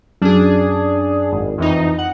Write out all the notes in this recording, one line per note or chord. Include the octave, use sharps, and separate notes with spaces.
F#2 D4 G#4
G#1
F2 E3 D#4
F#5